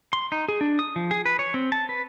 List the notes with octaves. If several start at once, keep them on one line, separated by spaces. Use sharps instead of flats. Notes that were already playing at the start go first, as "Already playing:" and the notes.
C6
D#4
G#4
D4
D#6
F3
G#4
B4
C#5
C4
A5
B4